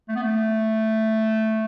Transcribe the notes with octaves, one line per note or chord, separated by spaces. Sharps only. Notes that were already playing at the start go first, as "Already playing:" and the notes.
A3
B3
A3